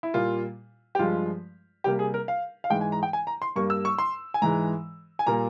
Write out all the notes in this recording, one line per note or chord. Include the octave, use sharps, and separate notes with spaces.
E4
A#2 G3 A#3 F4
G4
G2 F3 G#3 F4
C3 G3 A#3 G4
G#4
A#4
F5
F5
G#2 E3 G#3 G5
G#5
A#5
G5
G#5
A#5
C6
G2 G3 A#3 C#6
E6
C#6
C6
G#5
G#2 E3 G#3 A#5
G#5
A#2 G3 A#3 A#5